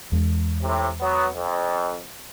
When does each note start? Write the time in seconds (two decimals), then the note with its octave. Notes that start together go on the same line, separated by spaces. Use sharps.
0.12 E2 E3 G#3
0.62 A2 C3
1.01 F#3 B3
1.34 F2